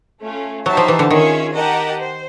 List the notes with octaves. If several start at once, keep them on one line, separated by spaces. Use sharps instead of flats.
A3 C#4 F4
F#3 D#4 G4 C5 E5 A5
F3
E3
D3
D#3 C#4 F4 G#4 C#5 E5
G4 A#4 D#5 F#5 A5
C5